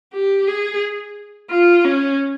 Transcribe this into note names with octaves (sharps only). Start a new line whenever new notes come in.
G4
G#4
F4
C#4